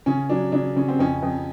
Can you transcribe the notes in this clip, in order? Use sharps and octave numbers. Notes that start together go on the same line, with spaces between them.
C#3 C#4
F#3 D4
C#3 D4
C#3 C#4
C4
F2 C#4
F2